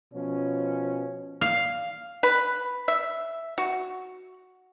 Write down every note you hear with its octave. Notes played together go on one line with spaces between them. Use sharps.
B2 F3 C#4
F5
B4
E5
F#4